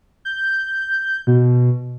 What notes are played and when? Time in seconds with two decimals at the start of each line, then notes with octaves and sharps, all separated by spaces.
0.25 G6
1.27 B2